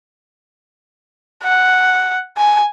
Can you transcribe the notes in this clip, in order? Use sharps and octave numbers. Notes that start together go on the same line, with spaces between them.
F#5
G#5